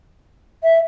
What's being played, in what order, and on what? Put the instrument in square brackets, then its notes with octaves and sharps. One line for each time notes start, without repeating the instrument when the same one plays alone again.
[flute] E5